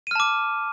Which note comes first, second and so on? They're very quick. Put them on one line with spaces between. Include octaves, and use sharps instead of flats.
D#7 F6 A5 D6